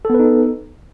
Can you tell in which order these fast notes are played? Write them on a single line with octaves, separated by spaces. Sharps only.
A4 B3 B4 D#4